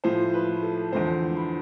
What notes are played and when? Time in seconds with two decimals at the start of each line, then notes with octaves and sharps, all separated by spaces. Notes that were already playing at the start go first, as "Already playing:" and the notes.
0.04 A2 F3 C5
0.34 B4
0.63 A4
0.92 E2 D3 F3 C5
1.37 B5